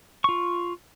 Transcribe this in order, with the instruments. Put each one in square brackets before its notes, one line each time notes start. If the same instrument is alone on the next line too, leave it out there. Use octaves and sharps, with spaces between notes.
[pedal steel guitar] F4 C#6